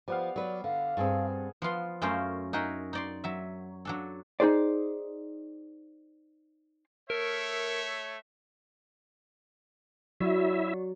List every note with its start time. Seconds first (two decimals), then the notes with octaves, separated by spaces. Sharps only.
0.08 F3 G3 B3 F5
0.36 F#3 B4 D5
0.64 D3 F5
0.97 G2 C4 G#4 A4
1.62 F3 B3 F4 C6
2.02 F#2 A3 C#4 F4 A#4 C5
2.53 D#4 F#4 G#4 A#4 D#5 E5
2.93 D#4 D5 C6
3.24 F#3 E5
3.85 F#3 D4 A4
4.40 D#4 F#4 G#4 C5 D5
7.10 A3 A#4 C#5 E5
10.21 F#3 E4 F#4 D5 E5 F#5